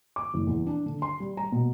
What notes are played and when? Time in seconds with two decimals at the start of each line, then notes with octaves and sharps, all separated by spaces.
0.16 D6
0.34 F#1
0.47 E2
0.67 D4
0.86 D3
1.02 C6
1.20 G3
1.37 A#5
1.52 B2